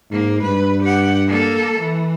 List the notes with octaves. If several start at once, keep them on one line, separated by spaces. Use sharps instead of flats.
G#2 A#3
G2 B4
G4 F#5
A#3 A4
E3